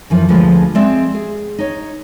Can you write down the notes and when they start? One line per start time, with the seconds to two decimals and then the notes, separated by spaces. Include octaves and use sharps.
0.10 F#2 E3 F3
0.29 D2 F3 G#3 B4
0.75 G#3 C4 D5 E5
1.15 G#4
1.59 D#4 C#5